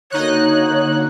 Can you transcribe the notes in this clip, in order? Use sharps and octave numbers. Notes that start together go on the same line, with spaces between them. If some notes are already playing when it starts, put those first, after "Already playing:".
D3 A#3 D#4 F#4 C#5 F#6